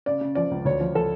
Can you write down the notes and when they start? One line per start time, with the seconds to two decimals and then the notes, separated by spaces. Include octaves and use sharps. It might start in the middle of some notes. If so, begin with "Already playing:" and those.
0.06 C#3 D5
0.21 C#3
0.35 F3 D5
0.51 C#2
0.65 D2 C#5
0.80 F3
0.95 F3 A4